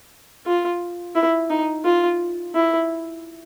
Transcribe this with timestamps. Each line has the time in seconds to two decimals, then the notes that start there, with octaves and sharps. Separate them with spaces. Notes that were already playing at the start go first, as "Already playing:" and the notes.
0.46 F4
1.15 E4
1.50 D#4
1.84 F4
2.54 E4